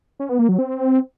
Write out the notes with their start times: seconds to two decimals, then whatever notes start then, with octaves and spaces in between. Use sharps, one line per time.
0.19 C#4
0.29 B3
0.39 A#3
0.49 F#3
0.58 C4